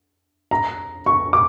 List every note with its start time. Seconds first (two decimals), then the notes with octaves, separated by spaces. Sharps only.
0.51 A#5
1.06 C#6
1.33 D6